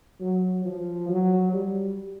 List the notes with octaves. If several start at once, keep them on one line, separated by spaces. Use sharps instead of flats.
F#3
F3
F#3
G3